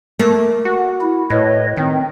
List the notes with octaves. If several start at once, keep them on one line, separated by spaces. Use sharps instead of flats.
A3 A#3
F#4
E4
A2 B4 C#5 D#5
D#3 C4